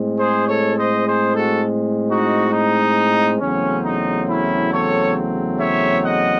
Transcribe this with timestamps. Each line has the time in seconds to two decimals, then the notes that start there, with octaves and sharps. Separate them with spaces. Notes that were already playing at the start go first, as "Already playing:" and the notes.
Already playing: A2 G#3 C4
0.19 G#4 C5
0.48 A4 C#5
0.77 C5 D#5
1.07 G#4 C5
1.36 F#4 A4
2.09 D#4 F#4
2.53 D#4
3.41 E2 C#3 F#3 A3 C4 C#4
3.85 D#4
4.29 C#4 E4
4.73 A4 C#5
5.60 C#5 E5
6.05 D#5 F#5